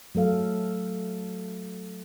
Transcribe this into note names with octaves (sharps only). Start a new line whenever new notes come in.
F#3 A3 A4 F5